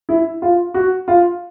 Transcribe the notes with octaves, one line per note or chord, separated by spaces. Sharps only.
E4
F4
F#4
F4